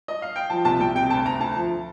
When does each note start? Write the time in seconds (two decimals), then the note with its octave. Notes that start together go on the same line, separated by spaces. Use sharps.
0.08 D#5
0.22 F5
0.36 G5
0.50 F3 A5
0.65 C2 A5
0.80 C2 G5
0.95 C3 G5
1.10 D2 A5
1.26 D2 A#5
1.41 D2 A5
1.56 F3